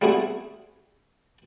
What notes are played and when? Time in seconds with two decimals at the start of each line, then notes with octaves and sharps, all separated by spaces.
0.01 G3 A3 B3 C4 F#4 G#4